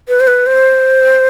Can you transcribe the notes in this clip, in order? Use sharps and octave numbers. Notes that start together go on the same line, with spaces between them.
B4
C5
B4
C5